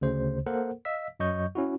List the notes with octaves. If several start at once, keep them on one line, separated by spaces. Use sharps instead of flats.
D2 C#3 C5
A#3 A4 A#4 C5 F#5
D#5 F5 E6 B6
F#2 F#3 D#5 C#6 G6
C#4 E4 F#4